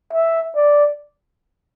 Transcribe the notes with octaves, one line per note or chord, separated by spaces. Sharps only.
E5
D5